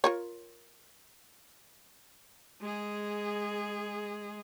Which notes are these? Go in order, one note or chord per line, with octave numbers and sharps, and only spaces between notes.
F4 A#4 C#5
G#3 G#4